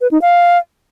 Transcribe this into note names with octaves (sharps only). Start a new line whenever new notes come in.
B4
D#4
F5